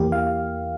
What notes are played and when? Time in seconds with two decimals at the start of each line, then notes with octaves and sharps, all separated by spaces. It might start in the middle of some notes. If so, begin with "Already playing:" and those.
Already playing: E2 E3 A#3 G4
0.12 F5